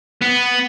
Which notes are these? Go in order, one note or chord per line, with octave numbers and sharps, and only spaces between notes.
B3